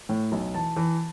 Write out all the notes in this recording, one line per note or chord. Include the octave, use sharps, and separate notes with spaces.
A2
B1
E3 A5
E3